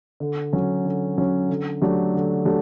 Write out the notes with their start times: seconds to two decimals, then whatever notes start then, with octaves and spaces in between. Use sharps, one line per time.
0.20 D3
0.53 F#3 C#4
0.85 D3
1.18 F#3 C#4
1.49 D3
1.82 F#3 A3 D4 G4
2.14 D3
2.45 F#3 A3 D4 G4